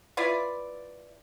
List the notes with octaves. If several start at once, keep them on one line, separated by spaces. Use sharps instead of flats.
E4 F4 B4 D5